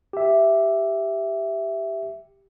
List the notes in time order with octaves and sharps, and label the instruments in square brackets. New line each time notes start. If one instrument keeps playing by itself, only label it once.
[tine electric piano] G4 E5